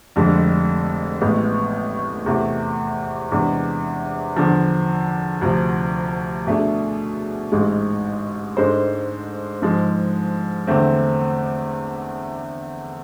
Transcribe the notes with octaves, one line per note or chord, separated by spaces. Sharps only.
F1 F2 D3 G#3
A1 A2 G#3 B3
E2 C3 E3 A3
E2 C3 E3 G#3 D4
E2 D3 F3
D2 C3 F3
B2 A3 D4 G#4
A1 G#2 G#3
G#2 G#3 D4 A4 C5
G#2 F3 G#3
E2 D3 A3 C4